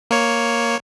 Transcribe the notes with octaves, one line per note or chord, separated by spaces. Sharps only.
A#3 C#5